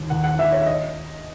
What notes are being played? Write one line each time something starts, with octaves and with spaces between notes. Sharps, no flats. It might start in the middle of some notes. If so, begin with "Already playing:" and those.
Already playing: D#2
D#3 F#5
F#5
D#2 E5
C#5
E5
D#5